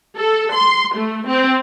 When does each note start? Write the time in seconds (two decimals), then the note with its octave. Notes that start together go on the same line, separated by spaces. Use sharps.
0.17 A4
0.53 C6
0.97 A3
1.27 C4